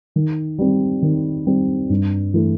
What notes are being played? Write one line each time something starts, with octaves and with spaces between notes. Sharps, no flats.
D#3
G3 C4
D#3
G3 C4
G2
E3 A3